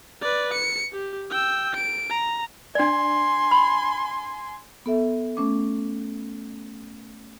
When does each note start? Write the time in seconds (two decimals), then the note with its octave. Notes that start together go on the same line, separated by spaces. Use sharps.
0.21 B4 D5
0.53 C#7
0.93 G4
1.30 G5 E6
1.75 D7
2.10 A#5
2.75 D4 D5 G#5 C6
3.51 B5
4.86 B3 A4 E5
5.37 A3 C#4 D6